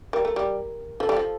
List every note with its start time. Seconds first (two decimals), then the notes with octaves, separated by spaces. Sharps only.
0.13 G3 A#4
0.25 A3
0.36 G3
1.00 F3 A4
1.09 G3
1.17 F3